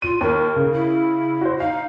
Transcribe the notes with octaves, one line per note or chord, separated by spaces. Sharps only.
F4 D#7
D#2 A#4
C#3
E4
F#4 C5
D#4 F5